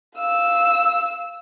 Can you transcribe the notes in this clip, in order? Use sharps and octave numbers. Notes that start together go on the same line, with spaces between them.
F5 E6